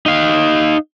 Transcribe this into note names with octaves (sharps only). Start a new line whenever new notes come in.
D#4 F5